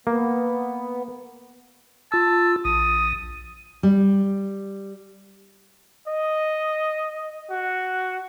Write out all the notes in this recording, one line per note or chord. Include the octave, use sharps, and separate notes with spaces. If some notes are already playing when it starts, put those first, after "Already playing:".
A#3 B3
F4 A5 E6
A#1 D#6
G3
D#5
F#4